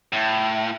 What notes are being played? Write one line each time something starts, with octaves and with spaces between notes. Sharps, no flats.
A2